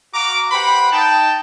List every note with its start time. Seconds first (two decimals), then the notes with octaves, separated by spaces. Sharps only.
0.14 F#4 F5 A#5 D6
0.51 G4 B4 C5 F#5 G5 B5
0.92 D#4 G5 A5